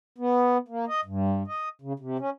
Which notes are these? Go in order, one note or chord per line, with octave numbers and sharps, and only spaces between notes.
B3
A#3
D#5
G2
D#5
C#3
C3
C#4